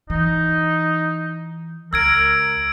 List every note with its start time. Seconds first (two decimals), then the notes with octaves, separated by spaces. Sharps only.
0.10 E3 D#4
1.93 C#2 A#4 E6 G#6 D7